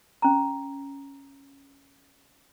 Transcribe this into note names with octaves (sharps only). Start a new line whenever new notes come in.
C#4 A#5